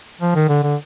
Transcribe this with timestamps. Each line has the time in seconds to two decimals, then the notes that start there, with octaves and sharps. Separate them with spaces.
0.21 F3
0.35 D#3
0.49 D3
0.63 D3